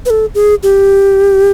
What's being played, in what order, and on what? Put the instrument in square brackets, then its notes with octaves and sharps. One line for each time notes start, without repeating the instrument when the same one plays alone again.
[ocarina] B4
A4
G#4
G4